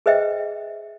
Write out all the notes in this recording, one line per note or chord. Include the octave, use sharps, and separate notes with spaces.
G#4 B4 C5 D#5 E5 G5